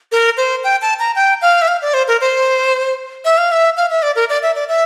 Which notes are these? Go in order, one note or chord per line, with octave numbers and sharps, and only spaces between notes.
A#4
C5
G5
A5
A#5
G5
F5
E5
F5
D5
C5
A#4
C5
E5
F5
E5
F5
E5
D5
A#4
D5
E5
D5
E5